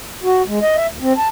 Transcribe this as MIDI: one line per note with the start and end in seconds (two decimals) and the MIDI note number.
0.23 0.42 66
0.47 0.59 56
0.62 0.76 75
0.76 0.87 76
0.90 0.98 38
1.01 1.13 60
1.17 1.28 81